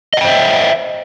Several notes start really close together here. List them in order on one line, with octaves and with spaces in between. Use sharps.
D#5 F#5 G5 C5 E5